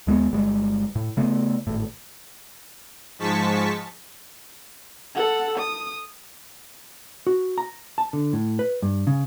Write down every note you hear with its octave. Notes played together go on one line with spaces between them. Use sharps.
D#2 G#3 A#3 B3
G1 G3 G#3
A2
C#3 A3 B3
G#1 A2
G#2 F3 G#3 A5 C#6 B6
A4 F#5
D#6
F#4
A#5
A5
D3
A2
B4
G2
C#3